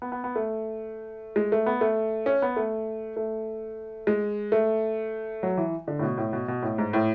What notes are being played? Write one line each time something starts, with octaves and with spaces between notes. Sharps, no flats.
B3
B3
B3
A3
G#3
A3
B3
A3
C#4
B3
A3
A3
G#3
A3
F#3
E3
D3
A2
B2
A2
B2
B2
A2
G#2
A2